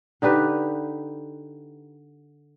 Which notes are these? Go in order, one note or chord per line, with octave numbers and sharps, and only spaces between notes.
D3 D#4 G4 B4